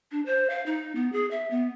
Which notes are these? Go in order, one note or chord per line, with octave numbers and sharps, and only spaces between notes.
D4
C5
F5
D#4
B3
G#4
E5
B3